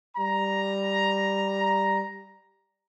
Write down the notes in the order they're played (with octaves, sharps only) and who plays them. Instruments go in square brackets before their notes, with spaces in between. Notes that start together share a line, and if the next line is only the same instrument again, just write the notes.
[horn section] G3 A#5